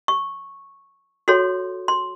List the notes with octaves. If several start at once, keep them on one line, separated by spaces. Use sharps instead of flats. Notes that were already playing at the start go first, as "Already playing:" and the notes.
C#6
F#4 A4 C#5 C6
C6